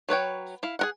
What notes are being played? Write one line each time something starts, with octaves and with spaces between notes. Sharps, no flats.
F#3 B4 C#5 G5
E4 F5
G#4 A#4 F#5